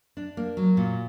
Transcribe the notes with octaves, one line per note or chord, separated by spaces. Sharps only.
D4
A#3
F#3
A#2